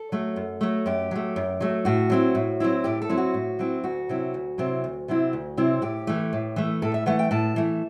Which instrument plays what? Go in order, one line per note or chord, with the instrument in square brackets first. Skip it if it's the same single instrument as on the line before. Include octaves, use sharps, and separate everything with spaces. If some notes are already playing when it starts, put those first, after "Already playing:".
Already playing: [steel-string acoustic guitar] A4
F#3 A3
F#2
F#3 A3
F#2 G4
F#3 A3
F#2
F#3 A3
A2 F#4
F#3 C4 E4
A2
F#3 C4 E4
A2 G4
A4
F#3 C4 E4
F#4
A2
F#3 C4 E4
D2 F#4
C3 F#3 C4 E4
D2
C3 F#3 C4 E4
D2
C3 F#3 C4 E4
D2
C3 F#3 C4 E4
A2 G4
E3 A3
A2
E3 A3
A2 A4
E5
E3 A3 F#5
G5
A2 A5
E3 A3